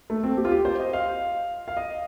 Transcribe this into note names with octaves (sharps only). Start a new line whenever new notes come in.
A3
C4
G4
F4
G4
C5
D#5
F5
F5
D#5